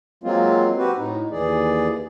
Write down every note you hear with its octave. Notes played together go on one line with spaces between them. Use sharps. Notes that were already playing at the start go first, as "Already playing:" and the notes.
F#3 G#3 A#3 C4 F4
C4 F#4 G4 B4
A2 D#4
D#2 E3 G#4 D5